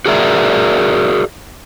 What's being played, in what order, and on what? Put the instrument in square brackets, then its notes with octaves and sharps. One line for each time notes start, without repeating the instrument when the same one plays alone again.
[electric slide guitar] F#4 G#4 A#4 D5 E5